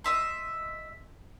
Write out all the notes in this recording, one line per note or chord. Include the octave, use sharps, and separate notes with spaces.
D#5 E5 C6